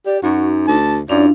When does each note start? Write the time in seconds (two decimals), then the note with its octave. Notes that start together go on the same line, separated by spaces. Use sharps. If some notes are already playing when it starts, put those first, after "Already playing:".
0.06 G4 D5
0.23 F#2 D#4 F#4
0.67 D2 A5
1.09 F#2 D4 E4 F4 D5